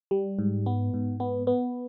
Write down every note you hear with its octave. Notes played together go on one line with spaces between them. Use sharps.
G3
G#2
B3
G#2
B3
B3